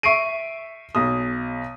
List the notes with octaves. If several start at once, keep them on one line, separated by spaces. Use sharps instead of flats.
E5 C#6 C7 D7 D#7
B1 D#6